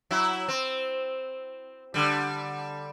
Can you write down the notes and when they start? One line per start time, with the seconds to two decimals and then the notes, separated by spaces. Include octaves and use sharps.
0.11 F#3 E4
0.48 C4
1.94 D3 G3